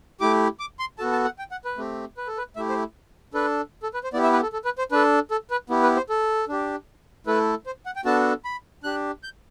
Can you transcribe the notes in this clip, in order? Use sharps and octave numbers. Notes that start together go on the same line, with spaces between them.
A3 E4 G4 D6
D6
C6
B3 F#4 A4 A5
A5
F#5
G5
F#5
B4
A3 C4 G4
B4
A4
B4
A3 E4 G4 E5
C5
D4 A4 B4
A4
B4
C5
B3 E4 G4 D5
E5
B4
A4
A4
B4
C5
D4 A4 B4
A4
B4
B3 E4 G4
B4
C5
A4
D4 G4
A3 E4 A4 B4
C5
F#5
G5
B3 D4 F#4 A4 A5
B5
D4 G4 F#6
G6